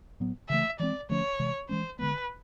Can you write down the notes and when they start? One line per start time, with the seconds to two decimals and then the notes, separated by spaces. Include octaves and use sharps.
0.20 A2 F#3 B3
0.49 C#3 E3 A3 E5
0.79 E3 G#3 C4 D5
1.09 D3 F3 A3 C#4 C#5
1.39 C3 E3 G#3
1.69 E3 G#3 C#4 C5
1.99 D3 F3 G#3 B3 B4